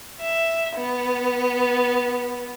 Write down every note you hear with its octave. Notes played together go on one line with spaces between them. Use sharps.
E5
B3